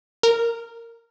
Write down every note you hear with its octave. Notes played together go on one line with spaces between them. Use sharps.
A#4